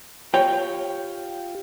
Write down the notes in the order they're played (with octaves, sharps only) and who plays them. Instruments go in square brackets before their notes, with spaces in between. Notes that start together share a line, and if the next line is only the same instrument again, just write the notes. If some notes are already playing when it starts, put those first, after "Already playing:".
[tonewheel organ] F4 G4 [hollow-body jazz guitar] C#5 G5